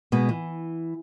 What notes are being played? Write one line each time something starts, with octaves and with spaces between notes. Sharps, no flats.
B2 G#3 B4
E3